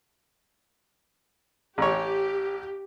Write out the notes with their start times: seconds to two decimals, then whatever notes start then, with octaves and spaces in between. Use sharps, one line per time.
1.78 A1 G4 C#5